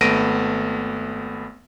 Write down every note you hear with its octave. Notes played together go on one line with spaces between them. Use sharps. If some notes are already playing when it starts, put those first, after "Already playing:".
G#1 A3 B3 A#6 D7 D#7